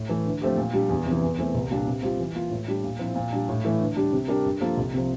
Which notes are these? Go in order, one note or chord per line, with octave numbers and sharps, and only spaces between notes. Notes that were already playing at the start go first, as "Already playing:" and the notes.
Already playing: A2
E3 A3
D3
F3 A3 C4 G4
A#2
G3 D4
E2
C3 E3
E2
E3 A3 C4
C2
A#2 G3 D4
C3
G3 C4 F4
E3
A#3 F4
A2
G3 D4
A#2
F3 C4 E4
A#2
G3 D4
A2
E3 A3 E4
D3
G3 D4 G4
C3
G3 D4 G4 A#4
G2
F3 A#3 F4 A4
C2
C3 F3